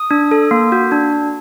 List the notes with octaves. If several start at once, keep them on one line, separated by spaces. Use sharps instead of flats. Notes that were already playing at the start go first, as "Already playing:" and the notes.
Already playing: D#6
D4
A4
A#3
F#4
D4